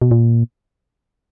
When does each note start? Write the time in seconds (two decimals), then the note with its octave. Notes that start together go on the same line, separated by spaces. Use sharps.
0.02 B2
0.11 A#2